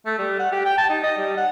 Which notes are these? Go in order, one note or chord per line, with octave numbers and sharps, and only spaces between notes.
A3
G3
F#5
G4
G5
A5
D#4
D#5
G3
F#5